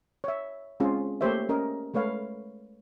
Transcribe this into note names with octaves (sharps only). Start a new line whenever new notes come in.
C#5 E5
G#3 C4 C#4 F4 G#4
A3 A#3 G4 C5 C#5 E5
C#4 A#4 D#5
G#3 A3 B4 C#5 F5